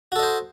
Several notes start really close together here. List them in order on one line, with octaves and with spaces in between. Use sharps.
F#4 A4 D#5 C5